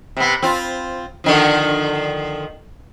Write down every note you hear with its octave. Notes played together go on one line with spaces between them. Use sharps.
C3 B3
C4 F4
D3 D#3 F3